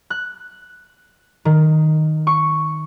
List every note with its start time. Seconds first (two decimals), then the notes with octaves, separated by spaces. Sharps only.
0.10 F#6
1.45 D#3
2.27 C#6